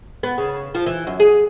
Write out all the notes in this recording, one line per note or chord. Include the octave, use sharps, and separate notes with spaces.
B3
C#3
F3
E3
F#2
G#4